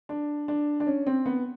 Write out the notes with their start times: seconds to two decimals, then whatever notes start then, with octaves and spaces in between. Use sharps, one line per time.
0.09 D4
0.48 D4
0.80 D4
0.87 C#4
1.07 C4
1.26 B3